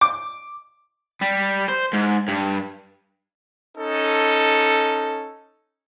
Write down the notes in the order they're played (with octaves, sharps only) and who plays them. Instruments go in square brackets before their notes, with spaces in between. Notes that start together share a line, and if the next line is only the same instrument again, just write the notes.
[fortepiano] D6
[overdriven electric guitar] G3
C5
G#2
G2
[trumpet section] C#4 D#4 A4